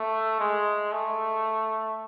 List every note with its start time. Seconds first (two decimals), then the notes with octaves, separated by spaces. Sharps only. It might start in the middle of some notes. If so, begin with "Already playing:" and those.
Already playing: A3
0.40 G#3
0.93 A3